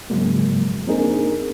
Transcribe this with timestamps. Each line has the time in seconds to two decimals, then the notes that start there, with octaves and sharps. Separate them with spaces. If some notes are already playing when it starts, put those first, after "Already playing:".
0.10 G#2 C#3 F3 F#3 G#3 A#3
0.87 A#3 C4 D4 D#4 G#4 A#4